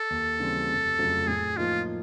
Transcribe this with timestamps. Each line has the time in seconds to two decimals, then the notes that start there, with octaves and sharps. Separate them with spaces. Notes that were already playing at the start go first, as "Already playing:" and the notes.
Already playing: A4
0.10 D#2
0.39 C#3 E3 G3 C4
0.68 F1
0.98 F2 C#3 F#3 A3
1.27 A2 G#4
1.57 F3 A#3 D#4 F4